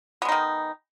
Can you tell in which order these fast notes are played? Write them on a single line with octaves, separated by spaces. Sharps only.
B3 G#3 D#4 D#3